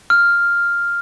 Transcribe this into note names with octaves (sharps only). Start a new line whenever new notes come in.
F6